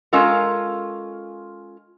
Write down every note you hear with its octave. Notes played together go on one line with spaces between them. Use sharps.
G#3 C#4 F4 A4 A#4